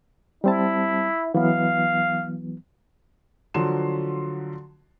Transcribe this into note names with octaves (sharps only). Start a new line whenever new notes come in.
G3 C4 E4 A5
E3 F#3 B3 F5
D3 F3 F#3 F#4 C6 E7